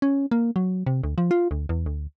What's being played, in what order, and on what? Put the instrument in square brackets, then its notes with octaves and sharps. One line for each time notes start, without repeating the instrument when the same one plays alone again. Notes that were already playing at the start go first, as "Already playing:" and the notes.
[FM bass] C#4
A#3
F#3
C3
D2
F3
F4
D2
E2
D2